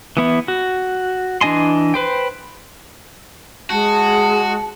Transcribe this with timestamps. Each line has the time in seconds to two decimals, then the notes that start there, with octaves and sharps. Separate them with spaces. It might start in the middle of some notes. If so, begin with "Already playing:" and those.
0.17 E3 B3 E4
0.48 F#4
1.41 E3 D4 D#5 G#5 C6
1.94 B4 C5 G5
3.70 G#3 F#4 A5